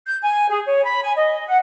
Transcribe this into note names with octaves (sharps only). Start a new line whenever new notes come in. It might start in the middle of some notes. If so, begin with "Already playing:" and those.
G6
G#5
G#4
C#5
B5
G#5
D#5
F#5